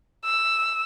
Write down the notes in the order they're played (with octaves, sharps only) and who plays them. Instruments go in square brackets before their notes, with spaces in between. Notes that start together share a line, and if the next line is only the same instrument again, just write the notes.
[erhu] E6